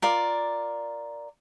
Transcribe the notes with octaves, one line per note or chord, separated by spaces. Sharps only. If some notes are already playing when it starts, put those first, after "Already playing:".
F4 A#4 D5